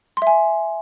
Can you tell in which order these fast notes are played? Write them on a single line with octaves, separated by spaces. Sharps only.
C6 E5 G#5